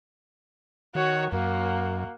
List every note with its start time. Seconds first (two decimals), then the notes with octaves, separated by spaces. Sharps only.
0.95 D#3 F#4 C#5
1.32 F#2 A#3 F#4